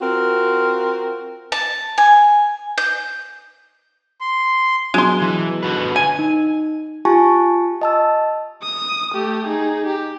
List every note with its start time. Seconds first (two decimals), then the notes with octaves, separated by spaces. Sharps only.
0.01 C4 F4 F#4 A#4
1.52 A5
1.98 G#5
2.78 G6
4.21 C6
4.94 B2 F#3 G#3 C6
5.22 E3
5.63 D3 F#4 B4
5.96 G#5
6.19 D#4
7.05 F4 G4 G#5 A5 C#6
7.82 D#5 A5 E6
8.62 D#6
9.14 A3 G4
9.47 D#4 G#4
9.86 G4